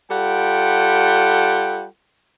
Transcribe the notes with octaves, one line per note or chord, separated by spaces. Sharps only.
G3 F4 A4 F#5 G5